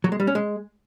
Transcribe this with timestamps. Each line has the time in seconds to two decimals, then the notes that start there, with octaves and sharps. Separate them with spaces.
0.04 F#3
0.12 G#3
0.20 G3
0.27 C#4
0.35 G#3